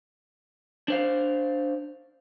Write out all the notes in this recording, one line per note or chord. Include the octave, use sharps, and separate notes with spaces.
D4 C5 F5